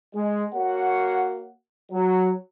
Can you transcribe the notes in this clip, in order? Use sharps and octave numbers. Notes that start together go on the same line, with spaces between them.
G#3
A#3 F#4 C#5 F#5
F#3